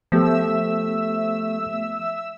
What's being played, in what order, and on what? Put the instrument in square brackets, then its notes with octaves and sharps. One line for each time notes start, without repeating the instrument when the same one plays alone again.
[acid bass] F3 [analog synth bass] A3 [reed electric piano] B3 G4 A4 [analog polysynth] E5 E6